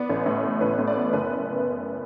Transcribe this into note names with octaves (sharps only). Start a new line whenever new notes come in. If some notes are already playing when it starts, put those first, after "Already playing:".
Already playing: B3 D5
A1
A2
B3
A1 B4
A2
D5
B3
F#1 B4